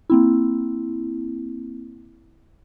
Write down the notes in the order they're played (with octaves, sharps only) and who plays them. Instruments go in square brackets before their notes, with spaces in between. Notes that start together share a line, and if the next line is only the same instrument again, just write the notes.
[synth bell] A#3 C4 E4